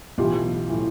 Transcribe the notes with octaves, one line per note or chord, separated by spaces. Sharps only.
B1 A2 E3 F4 G4
A2 E3